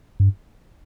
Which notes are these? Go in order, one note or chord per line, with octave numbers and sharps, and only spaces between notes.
G2